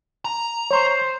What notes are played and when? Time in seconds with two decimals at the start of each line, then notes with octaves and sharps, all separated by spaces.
0.25 A#5
0.71 C5 C#5 C6 C#6